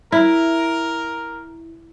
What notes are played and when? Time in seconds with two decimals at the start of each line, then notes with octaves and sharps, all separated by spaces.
0.12 E4 A#4